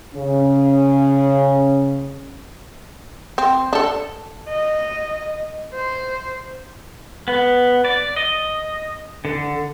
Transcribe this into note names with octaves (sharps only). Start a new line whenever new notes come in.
C#3 C#4
C4
D4 A4
D#5
C5
B3
D5
D#5
D3